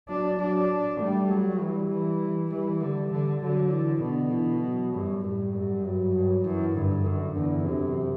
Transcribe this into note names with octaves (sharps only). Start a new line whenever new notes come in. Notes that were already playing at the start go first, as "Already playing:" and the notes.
F#3 D4
F#3 D4
G3 A3
F#3 G3
E3 G3
E3
E3 G3
D3 G3
D3
D3 F#3
E3
B2 D3
E3
F#3
F#2 G3
A2 G3
F#2 G3
G2 F#3
G2
F#2 E3
G2 D3
F#2 D3
E2 D3
F#2 C3